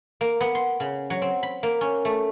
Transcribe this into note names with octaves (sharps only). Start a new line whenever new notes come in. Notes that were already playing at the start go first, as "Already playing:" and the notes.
A#3
B3
C6
C#3
F#3
C4
B5
A#3
C#4
A3